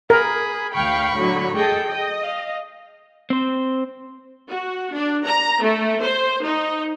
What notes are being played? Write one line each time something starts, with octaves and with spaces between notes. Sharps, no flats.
G#4 A#4 B5
D2 F5 G5 B5 C#6
A2 D3 F#3
G#4 A4 D#5 G5
D#5
F5
C4 C5
F#4
D4
A#5
A3
C5
D#4